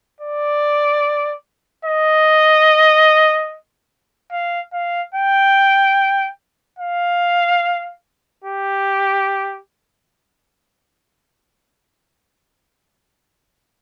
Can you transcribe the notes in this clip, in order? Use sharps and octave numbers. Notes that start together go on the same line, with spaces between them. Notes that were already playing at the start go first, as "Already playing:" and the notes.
D5
D#5
F5
F5
G5
F5
G4